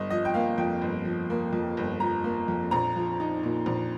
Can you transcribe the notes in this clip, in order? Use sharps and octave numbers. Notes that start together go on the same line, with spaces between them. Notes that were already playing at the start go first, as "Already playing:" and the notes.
Already playing: G1 D#5
F3 D#5
G5
A#3 F5
F2 G5
G1
F3
A#3
F2
G1
F3 A#5
A#3
F2
A#1 A#5
F3
D#4
A#2
A#1